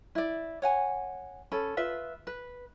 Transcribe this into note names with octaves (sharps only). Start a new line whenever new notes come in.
E4 D5
C#5 F#5 G#5
C#4 A4 B5
F4 B4 E5
B4